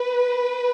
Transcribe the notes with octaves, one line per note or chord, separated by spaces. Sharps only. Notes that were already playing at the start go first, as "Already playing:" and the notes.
Already playing: B4